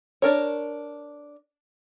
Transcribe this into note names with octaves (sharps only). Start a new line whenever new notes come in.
D4 A#4 C#5